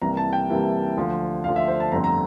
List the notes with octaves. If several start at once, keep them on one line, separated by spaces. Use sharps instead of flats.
C2 C3 E3 A#3 A#5
A5
G5
C2 C3 E3 A#3
D2 D3 F3
D2 D3 F3 F5
E5
C5
A5
G1 F2 D3 A3 C4 A#5
A#5